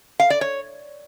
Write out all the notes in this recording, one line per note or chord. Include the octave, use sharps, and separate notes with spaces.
F5
D5
C#5